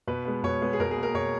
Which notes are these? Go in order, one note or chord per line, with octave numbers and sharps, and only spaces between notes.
B2 B4
G#3 B3
B2 C#5
G#3 B3
G#4
B2 A#4
G#4
A#3
A#4
B2 C#5